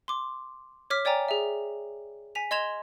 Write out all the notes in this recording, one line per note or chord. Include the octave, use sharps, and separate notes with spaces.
C6 D6
C#5 D6 F6 B6
C#5 D5 G5 G#5 A#5
G#4 E5
G#5 B6 F7
D#5 C6 G#6 E7 F7 G7